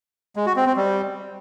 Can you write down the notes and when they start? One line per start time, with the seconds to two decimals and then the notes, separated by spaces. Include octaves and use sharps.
0.36 G#3
0.46 F#4
0.56 C4
0.66 C4
0.76 G3